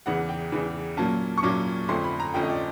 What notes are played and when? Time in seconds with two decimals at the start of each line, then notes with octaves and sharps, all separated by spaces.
0.06 E2 C#3 E3 F#5
0.29 G5
0.52 E2 C#3 E3
0.97 A#2 F#3 A#3 C#4 A5
1.38 C#6
1.43 A#2 F#3 A#3 C#4 D6
1.88 F2 D3 F3 A3 C#4 C6
2.04 B5
2.20 A#5
2.34 F2 D3 F3 A3 C#4 G5
2.43 D#5
2.49 D5